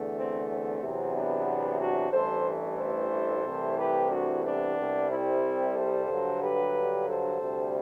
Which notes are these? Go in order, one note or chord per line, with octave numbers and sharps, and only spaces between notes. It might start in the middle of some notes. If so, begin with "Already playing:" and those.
Already playing: E2 D3 A3
C4
C4
E2 C3 F#3
B3 D4
D4 F#4
A1 G2 E3 A3 A4 C5
A4 C5
C2 C3 E3 A3
G4 B4
D4 F#4
B3 D4
C2 C3 G3
C4 E4
A4 C5
G2 D3 F#3
G4 B4
A4 C5
D2 C3 G3